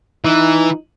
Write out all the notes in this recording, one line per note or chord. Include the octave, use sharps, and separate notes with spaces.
E3 D#4